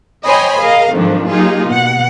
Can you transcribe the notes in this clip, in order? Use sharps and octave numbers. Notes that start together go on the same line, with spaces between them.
C5 C#5 D#5 G5 G#5 B5
G#4 A#4 D#5 F5
F2 G#2 D#3 F3 F#3 D4
F#3 A#3 D#4 F4 G4 G#4
B2 F#5